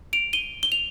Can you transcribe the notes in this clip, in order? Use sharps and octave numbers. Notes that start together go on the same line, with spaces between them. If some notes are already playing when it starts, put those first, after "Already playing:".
D7 F7
D#7 G7
G7
F7